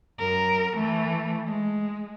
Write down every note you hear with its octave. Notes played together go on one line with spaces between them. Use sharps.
F#2 A#4
E3 A3
G#3